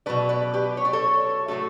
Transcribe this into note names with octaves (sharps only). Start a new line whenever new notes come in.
B2 F#3 A3 B4 D5
B4 D5
G4 B4
C#5
D5
A4 C#5
A2 F#3 A3 F#4 A4